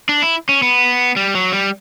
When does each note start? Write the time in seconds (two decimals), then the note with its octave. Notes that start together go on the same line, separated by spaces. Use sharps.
0.09 D4
0.22 E4
0.49 C#4
0.63 B3
1.16 G3
1.35 F#3
1.52 G3